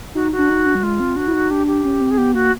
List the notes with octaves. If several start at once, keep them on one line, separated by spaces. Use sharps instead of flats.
D#4 F#4
F#4
D4
D#4
D4
G3
G#3 F4
C4
D4 F#4
E4
D#4
D4 G4
G4
C#4
C4
G#4
B3 G4
A#3 F#4